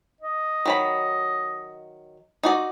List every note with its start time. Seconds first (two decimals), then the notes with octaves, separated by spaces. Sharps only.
0.21 D#5
0.66 D#3 F#3 B5
2.43 D#4 F#4 D5